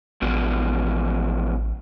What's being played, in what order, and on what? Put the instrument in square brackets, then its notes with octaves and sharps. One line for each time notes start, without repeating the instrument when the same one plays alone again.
[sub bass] A1 [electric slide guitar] E2 B2 F3